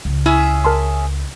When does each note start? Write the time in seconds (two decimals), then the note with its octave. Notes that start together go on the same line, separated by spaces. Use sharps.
0.05 C#2
0.26 C#4 E4 G#4 E5
0.65 A#4 A5 C6